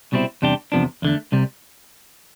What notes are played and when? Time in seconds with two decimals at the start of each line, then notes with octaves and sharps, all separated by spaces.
0.12 C2 B2 G3 C4 E4
0.42 E2 C3 G3 D4 G4
0.72 E2 C3 F3 B3 D4
1.02 E2 D3 A3
1.32 C2 C3 G3